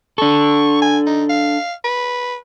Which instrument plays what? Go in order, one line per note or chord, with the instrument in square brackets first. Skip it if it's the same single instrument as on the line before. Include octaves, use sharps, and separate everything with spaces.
[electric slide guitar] D4 A4 [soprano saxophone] C#6
[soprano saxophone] G#5
D#4
F5
B4